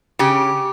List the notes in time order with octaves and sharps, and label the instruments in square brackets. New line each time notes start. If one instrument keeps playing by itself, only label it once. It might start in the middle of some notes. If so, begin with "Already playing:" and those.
[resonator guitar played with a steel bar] C#3 G4